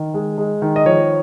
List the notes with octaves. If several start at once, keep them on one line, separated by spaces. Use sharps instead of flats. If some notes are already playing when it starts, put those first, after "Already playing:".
Already playing: D#3
G#3
G#3
D#3
D#5
F3 C#5